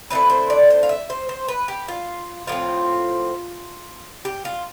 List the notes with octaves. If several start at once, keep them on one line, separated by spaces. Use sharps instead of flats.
D3 A3 C4 E4 B4
C5
D5
C5
F5
E5
C5
C5
B4
G4
F4
A2 F3 C4 F4
G4
F4